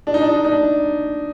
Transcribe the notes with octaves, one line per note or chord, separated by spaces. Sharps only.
D4
D#4
D4
D#4
D4
D#4
D4